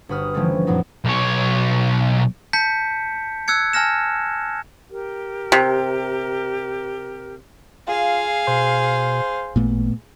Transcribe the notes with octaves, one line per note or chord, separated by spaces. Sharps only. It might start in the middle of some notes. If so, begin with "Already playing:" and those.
G1 F#4 B4 D#6 F6
D3 E3 F3 G3 A3 C#4
F#2 A#2 F#3 B3 D#4
B1 C#5
A5 G6 B6 C#7
E6 F#6 G#6 C#7
G#5 A5 F6 A#6 E7
G4 A#4
C3
F4 G#4 F5
B2 C5
A1 A#2 A3 B3